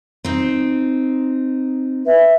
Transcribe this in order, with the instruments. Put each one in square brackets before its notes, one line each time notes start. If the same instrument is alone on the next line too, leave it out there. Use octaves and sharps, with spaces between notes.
[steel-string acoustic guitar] C4 D#4
[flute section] B4 E5